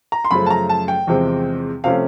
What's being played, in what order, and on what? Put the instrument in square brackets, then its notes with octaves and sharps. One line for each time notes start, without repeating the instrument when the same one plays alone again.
[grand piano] A#5
C6
F#2 C#3 F3 A3 B5
A5
A#5
A5
G5
E2 C3 F3 G#3 C4
C3 F3 A3 C#4 F5